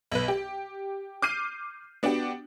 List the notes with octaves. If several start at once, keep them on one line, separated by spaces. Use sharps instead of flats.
B1 B4
G4
D6 F6 G6 C7 D#7
B3 D4 F#4 G4